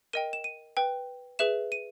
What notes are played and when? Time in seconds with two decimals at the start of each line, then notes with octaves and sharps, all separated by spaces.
0.13 A#4 D#5 G5 D#7
0.33 E7
0.44 D#7
0.77 B4 G5
1.39 G#4 B4 E5 E7
1.72 D#7